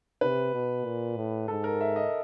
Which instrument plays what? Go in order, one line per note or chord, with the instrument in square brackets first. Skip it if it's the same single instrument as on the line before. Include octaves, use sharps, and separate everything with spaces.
[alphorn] C3 [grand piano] B4
[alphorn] B2
A#2
A2
[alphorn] G#2 [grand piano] A4
[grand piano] A#4
E5
D#5